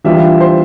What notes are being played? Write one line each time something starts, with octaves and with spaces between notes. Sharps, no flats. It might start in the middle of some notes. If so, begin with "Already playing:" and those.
E3 G3 D4 F4 E5
C5